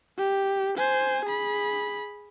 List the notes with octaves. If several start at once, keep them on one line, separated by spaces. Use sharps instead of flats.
G4
C5 G#5
G#4 B5